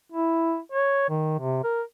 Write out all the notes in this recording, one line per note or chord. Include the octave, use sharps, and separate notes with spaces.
E4
C#5
D#3
C3
A#4